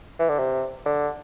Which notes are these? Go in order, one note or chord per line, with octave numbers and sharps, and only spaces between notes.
E3
D3
C3
D3